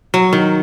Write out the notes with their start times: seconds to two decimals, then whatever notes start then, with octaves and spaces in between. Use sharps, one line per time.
0.14 F#3
0.33 D#3